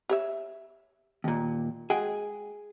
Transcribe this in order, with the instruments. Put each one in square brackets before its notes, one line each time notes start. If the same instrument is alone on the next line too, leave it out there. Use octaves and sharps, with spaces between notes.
[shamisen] G4 C#5 E5
[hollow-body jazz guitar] D#2 A#2
[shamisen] G#3 F#4 G5 [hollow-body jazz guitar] G#4